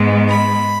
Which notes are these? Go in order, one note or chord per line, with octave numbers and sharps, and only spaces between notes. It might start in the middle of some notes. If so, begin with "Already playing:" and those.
Already playing: G#2 G#3 B3
B5